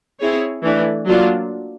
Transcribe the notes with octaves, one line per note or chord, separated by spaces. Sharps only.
C4 E4 G#4 C#5
E3 A3 D4
F#3 A#3 D4 F4